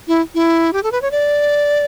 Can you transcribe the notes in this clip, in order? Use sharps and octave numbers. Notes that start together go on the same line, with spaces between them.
E4
E4
G4
A4
B4
C#5
D5